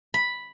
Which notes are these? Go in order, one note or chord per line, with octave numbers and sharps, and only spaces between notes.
B5